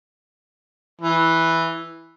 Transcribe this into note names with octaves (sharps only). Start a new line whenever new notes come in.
E3